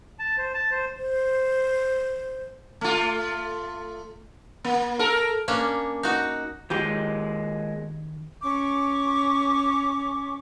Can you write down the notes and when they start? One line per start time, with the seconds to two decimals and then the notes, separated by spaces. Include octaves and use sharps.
0.19 A5
0.38 C5
0.54 A5
0.71 C5
0.98 C5
2.81 A3 F4
4.64 A#3
4.99 A4 A#4
5.48 A#3 C#4 D4
6.03 D#4 F#4
6.70 A#2 D#3 G#3 G4 G5
8.42 C#4 C#6 D6